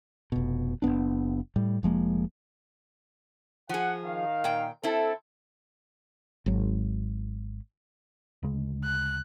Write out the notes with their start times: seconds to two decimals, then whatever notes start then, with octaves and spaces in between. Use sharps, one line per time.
0.32 F1 B2
0.82 F#1 G#2 B3 D4
1.56 A2 G3
1.83 F1 F3 G#3 A#3
3.69 F3 G#4 F#5
4.04 D#3 F5
4.44 A#2 G5
4.84 C4 E4 A4
6.46 G#1 F#3
8.43 D2 C#3 G#3
8.84 F#6